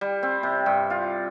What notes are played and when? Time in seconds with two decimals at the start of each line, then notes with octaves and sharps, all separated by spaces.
0.01 G3
0.23 C4
0.43 C3
0.66 G2
0.90 F4